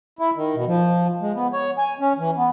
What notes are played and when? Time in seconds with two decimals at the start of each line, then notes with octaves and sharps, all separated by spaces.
0.19 E4
0.36 D#3
0.55 B2
0.67 F3
1.21 G#3
1.36 B3
1.53 C#5
1.78 G#5
1.99 C#4
2.19 E3
2.37 B3